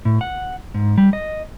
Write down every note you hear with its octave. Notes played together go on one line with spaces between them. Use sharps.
A2
F#5
G#2
G3
D#5